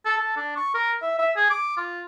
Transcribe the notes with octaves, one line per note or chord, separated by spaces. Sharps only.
A4
A4
D4
C#6
A#4
E5
E5
G#4
D6
F4